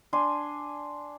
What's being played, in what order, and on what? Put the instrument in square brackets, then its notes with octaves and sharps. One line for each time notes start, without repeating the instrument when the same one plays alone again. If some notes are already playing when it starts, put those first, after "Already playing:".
[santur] D4 G#5 C6